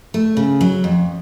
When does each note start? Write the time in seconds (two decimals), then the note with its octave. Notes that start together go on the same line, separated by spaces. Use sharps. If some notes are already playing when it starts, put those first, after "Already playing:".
0.14 A3
0.37 C#3
0.61 F#3
0.84 F2